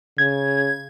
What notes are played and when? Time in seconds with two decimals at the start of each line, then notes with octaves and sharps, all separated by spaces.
0.18 C#3 G#6